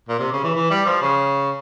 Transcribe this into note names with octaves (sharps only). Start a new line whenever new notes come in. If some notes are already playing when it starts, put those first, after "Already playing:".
A#2
C3
C#3
E3
E3
G3
F3
C#3